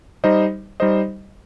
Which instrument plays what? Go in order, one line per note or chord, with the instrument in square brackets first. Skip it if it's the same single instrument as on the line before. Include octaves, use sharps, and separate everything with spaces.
[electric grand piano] G3 D#4 C5 D#5
G3 D#4 C5 D#5